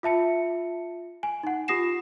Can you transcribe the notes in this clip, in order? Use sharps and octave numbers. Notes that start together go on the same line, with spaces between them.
F4 E5 A5 C#7
G#5
D#4 F#5
F4 G4 D#6 A#6 C7 E7